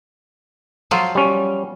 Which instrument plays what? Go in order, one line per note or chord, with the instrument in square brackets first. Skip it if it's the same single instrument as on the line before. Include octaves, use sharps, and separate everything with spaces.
[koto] F3 F#3 F4
[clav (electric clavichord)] G3 C#4